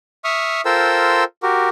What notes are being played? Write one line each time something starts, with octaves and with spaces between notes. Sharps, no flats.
E5 C#6 D#6 F6
F4 A4 A#4 C5 G5 E6
F#4 G4 A#4